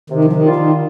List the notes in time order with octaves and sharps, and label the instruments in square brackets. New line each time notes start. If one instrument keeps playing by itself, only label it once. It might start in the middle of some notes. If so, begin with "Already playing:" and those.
[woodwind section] C3 [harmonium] D#3
[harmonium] F3
D#3
[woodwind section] G3 A#3 D4 F4
[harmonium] D#3